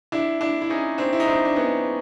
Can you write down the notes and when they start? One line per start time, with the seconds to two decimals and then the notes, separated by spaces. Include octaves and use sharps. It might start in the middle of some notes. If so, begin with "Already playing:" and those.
0.12 D4 E4
0.41 D4 E4
0.62 E4
0.70 C#4 D#4
0.98 C4 D4
1.13 E4
1.20 D#4
1.27 C4 D4
1.45 D4
1.56 B3 C#4